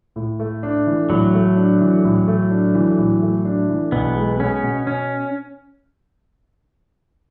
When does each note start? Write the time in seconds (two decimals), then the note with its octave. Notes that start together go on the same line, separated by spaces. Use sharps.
0.16 A2
0.40 A3
0.63 D4
0.87 E3
1.10 A2 F#3
1.34 A3
1.57 D4
1.81 E3
2.05 A2
2.28 A3
2.51 D4
2.75 E3
2.98 A2
3.22 A3
3.45 D4
3.69 E3
3.92 B1 B3
4.16 G#3
4.40 B3 C#4
4.63 B2
4.87 C#4